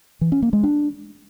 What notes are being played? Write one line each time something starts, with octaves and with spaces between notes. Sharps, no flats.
E3
C#4
A#3
G#3
D4